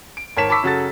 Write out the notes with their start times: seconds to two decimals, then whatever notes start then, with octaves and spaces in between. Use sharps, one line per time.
0.17 D7
0.37 G#1 A#4 C#5 A5 B6 E7
0.50 A5 B5 C#6 D6 E6 B6
0.63 F#2 C#3 F#4 A4 A5 A6